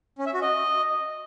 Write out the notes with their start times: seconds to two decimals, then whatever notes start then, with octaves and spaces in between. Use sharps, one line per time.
0.19 C#4
0.26 E5
0.34 F#4
0.42 D#5